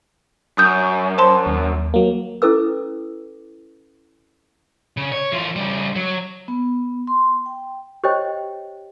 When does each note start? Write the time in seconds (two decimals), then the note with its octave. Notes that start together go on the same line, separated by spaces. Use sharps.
0.58 F#2 D#6 G6
1.18 C5 A5 C6
1.46 D#2
1.94 F#3 A#3
2.42 C#4 E4 A4 B4 D6 E6
4.97 C#3
5.12 C#5
5.32 E3 F4
5.56 C#3 G3
5.96 F#3
6.48 B3
7.07 C6
7.46 G5
8.04 G4 C5 C#5 D#5 G5